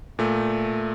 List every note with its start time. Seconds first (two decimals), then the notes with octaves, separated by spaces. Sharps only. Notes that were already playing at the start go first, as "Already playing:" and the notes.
0.19 A#2 A3